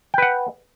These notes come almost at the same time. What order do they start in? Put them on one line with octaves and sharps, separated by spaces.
G5 B4 F#5